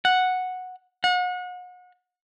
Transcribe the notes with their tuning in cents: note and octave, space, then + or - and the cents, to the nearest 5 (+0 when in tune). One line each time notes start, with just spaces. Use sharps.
F#5 -5
F#5 -35